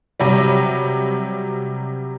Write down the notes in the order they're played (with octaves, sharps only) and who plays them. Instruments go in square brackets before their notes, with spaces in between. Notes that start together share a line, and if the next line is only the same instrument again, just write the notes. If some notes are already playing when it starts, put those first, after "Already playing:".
[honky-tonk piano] C3 F#3 G3